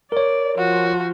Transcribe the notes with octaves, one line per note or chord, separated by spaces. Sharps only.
A#4 C#5 D5
F3 F#4